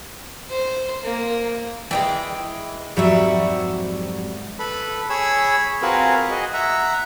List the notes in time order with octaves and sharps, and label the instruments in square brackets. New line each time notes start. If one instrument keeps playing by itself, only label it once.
[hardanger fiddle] C5
A#3
[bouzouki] E3 G3 G#3 [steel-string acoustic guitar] G5
[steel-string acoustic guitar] F2 G#2 F#3 [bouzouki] G3 F#4 E5
[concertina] A4 B4 B5
G#4 C#5 B5 E6
C4 F4 F#4 G#4 A#4 B4
F#4 G#4 D#5
E5 F#5 A#5